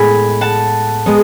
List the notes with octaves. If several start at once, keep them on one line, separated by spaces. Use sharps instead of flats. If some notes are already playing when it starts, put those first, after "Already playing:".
Already playing: A2 G#3 B3 G#5 B5
F#5 A5
G#3 B3